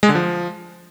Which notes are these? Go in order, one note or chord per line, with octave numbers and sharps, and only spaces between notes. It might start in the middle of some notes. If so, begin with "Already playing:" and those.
G#3
D3
F3